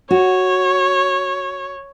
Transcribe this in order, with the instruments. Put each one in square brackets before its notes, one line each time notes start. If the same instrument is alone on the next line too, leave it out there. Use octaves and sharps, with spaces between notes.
[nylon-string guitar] F#4 [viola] C#5